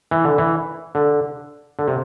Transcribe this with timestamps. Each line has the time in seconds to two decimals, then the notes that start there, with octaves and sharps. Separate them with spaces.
0.11 E3
0.25 D3
0.38 E3
0.95 D3
1.79 D3
1.88 C3